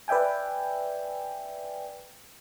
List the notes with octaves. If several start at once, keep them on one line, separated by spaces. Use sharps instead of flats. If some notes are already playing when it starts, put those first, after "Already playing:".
B4 D5 E5 G5 G#5